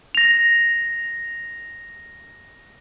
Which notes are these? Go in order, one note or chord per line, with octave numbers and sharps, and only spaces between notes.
A#6 F7